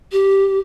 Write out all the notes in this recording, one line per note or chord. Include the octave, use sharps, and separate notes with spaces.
G4